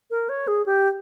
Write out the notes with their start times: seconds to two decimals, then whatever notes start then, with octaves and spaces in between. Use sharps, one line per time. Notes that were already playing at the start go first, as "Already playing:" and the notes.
0.11 A#4
0.29 C#5
0.48 G#4
0.66 G4